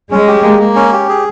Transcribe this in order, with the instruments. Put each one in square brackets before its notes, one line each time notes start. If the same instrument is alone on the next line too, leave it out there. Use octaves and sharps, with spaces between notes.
[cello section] G#3 [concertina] C#4
[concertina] G4
A#3
A#3
C#4
G4
G#4